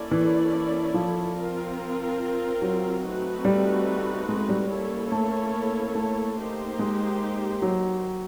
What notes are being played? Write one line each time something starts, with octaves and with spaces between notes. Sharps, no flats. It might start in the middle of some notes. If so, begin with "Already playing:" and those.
Already playing: A#3 C#4 E4 A4 D5
E3
F3
C4 F4 A#4
F#3
A3 C4 D#4 F#4 B4
G3
G#3
G3
A#3 C#4 E4 A4 C#5
A3
A3
A#3 D#4 G4 C5
G#3
F#3